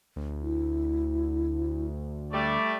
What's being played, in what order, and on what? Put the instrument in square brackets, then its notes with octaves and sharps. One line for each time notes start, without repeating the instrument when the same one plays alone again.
[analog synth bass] D2
[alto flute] E4
[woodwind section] G3 A3 D5